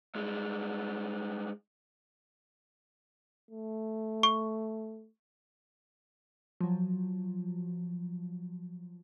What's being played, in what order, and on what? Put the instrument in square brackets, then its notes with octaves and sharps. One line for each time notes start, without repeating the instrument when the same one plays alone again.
[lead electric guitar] G2 G#3
[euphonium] A3
[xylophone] C#6
[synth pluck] F3 F#3